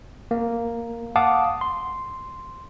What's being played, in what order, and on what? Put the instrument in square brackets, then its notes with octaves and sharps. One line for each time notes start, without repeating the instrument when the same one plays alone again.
[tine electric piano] A#3
F5 F#5 A5 D6 D#6
C6